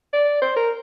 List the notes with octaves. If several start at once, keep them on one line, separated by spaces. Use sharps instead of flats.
D5
C5
A#4